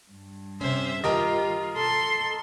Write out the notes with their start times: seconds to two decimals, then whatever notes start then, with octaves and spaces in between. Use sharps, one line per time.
0.11 G2
0.61 C3 C#4 C5 E5
1.04 D#3 F4 G4 A#4 D#5 G5
1.76 B2 A4 C6